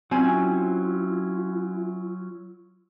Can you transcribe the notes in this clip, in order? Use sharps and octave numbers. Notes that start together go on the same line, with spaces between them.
F#3 C4 C#4 E4 F4 G#5